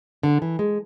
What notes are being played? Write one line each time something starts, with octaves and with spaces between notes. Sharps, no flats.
D3
E3
G#3